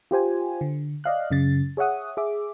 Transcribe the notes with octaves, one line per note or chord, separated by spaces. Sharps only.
F4 G4 C5 G#5
D3
D5 D#5 F5 F#6
F#2 C#3 A6
G#4 C#5 E5 F#5 D#6
G#4 E5 D6